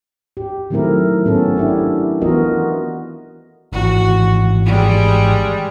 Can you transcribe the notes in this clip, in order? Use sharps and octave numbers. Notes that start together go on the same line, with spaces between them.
G4
D#3 F#3 A3 C4 E4 A#4
B3 C#4 E4 A4
D4 E4 G4
E3 B3 F4 F#4 A#4 D#5
G#1 E3 F#4
G3 G#3